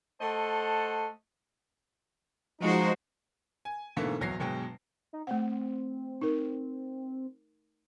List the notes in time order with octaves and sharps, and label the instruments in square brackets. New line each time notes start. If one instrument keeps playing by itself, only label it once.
[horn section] A3 A4 C5 D#5 F#5 A5
[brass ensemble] F3 D#4 [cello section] G#3 F#4 C5
[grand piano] G#5
G#2 B2 D3 E3 A3 A#3
D1 E2 F#3 A#6 C7
G1 B2 F#3 G#3 G5
[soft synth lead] D#4
[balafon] A3 F#5 [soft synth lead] C4
[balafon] D#4 A#4